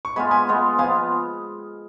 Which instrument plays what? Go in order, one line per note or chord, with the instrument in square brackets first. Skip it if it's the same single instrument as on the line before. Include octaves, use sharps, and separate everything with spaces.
[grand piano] C#6
[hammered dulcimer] G#3 B3 F4 [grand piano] G#5 B5
[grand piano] G#5 B5
[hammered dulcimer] G#3 B3 F4
[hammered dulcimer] F3 B3 F4 B4 [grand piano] F5 G#5